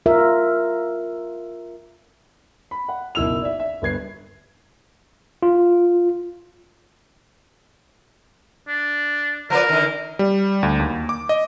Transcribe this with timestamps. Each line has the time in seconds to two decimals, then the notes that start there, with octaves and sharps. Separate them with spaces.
0.06 F4 A#4 E5
2.71 B5
2.88 F#5
3.15 F#1 B1 E4 E6 F7
3.42 D5 E5
3.60 E5
3.82 G1 B4 G#6 C7
5.43 F4
8.68 D4
9.50 F3 A#4 B4 D5
9.69 D3 D#3
10.19 G3
10.63 D2
10.79 D#2
11.09 D6
11.29 D#5